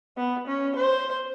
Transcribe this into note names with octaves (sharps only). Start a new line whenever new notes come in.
B3
C#4
C5